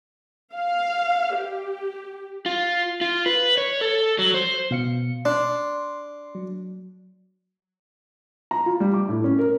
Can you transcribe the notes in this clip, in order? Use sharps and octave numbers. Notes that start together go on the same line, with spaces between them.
F5
G4
F4
F4
B4
C#5
A4
F#3
C5
B2 F5 C#7
D4 C6
F#3
A#5
F4
G3
D6
A2
C#4
A#4